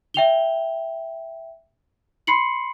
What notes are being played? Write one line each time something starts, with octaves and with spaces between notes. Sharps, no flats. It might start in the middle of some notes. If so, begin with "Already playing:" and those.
E5 G5 F7 G7
B5 C6 C7 C#7 F#7